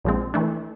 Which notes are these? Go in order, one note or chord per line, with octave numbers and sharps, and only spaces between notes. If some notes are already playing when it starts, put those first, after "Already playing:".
A#1 A#2 F3 G#3 C4
E3 A3 D4